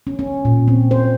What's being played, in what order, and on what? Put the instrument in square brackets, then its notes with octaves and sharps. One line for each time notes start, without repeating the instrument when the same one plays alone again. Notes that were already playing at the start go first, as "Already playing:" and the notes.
[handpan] C#4
C#4
A#2
C4
C5